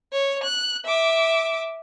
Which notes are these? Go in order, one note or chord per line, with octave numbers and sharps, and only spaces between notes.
C#5
F#6
E5 D6